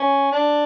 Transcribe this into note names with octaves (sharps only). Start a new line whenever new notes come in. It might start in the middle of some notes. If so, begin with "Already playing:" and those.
Already playing: C#4
D4